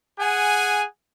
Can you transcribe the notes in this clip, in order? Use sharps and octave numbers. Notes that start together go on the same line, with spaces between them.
G#4 F#5 G#5